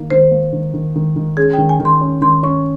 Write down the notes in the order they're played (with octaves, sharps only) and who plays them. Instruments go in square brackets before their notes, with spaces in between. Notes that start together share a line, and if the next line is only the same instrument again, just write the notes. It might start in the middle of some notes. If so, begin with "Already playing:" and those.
Already playing: [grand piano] D#3 A#3 D#4
[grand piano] D#3 [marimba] C5
[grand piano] A#3
D#3
D#3
D#3
D#3
[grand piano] C#4 [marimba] G#4
[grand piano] D#3 [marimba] G5
[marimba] G#5
[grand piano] D#3
[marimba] C6
[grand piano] C#4
[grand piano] D#3 [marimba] C6
[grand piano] C#4 [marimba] C#6